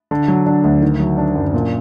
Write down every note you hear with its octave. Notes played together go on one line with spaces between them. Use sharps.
D3
F#3
D4
D2
D#3
F#3
D4
F#2
A#2